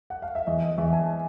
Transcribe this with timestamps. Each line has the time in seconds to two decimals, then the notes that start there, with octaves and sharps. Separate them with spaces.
0.10 F#5
0.22 F5
0.35 E5
0.47 E2 D#5
0.63 D#5
0.78 E2 E5
0.93 G#5